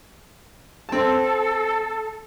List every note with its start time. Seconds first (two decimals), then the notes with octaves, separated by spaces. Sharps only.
0.89 C4 A4 A5